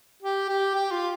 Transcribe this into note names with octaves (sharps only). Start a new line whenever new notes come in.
G4
G4
G4
F4